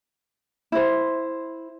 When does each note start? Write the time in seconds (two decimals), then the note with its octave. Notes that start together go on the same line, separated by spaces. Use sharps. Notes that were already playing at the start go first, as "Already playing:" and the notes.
0.72 E4 C5